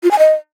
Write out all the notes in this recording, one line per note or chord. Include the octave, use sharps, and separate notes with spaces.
F4
G#5
D#5